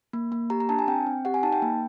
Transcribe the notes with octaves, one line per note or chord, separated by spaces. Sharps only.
A#3
A#3
G4 A#5
A#5
D4 A5
G#5
C4 G5
C4
G4 F#5
G#5
D#4 A5
G5
A#3